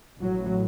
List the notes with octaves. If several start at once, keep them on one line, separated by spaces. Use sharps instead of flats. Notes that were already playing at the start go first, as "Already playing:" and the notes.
A1 A2 F#3